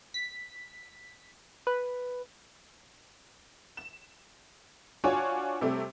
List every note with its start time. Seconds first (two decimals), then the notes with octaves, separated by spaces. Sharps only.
0.14 B6
1.67 B4
3.77 E7
5.04 D4 F4 F#4 C#5 G#5
5.61 C3 G3 A3 C4